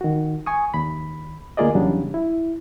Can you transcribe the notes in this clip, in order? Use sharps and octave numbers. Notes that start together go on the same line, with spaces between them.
D#3 F#4
G#5 C#6 D#6
D#2 B5
D2 A#3 F4 G#4 D5 D#5
E2 C#3 F#3 G3 D4
E4